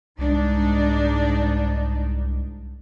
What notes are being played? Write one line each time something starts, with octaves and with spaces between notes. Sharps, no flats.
C2 G#2 D4 D#4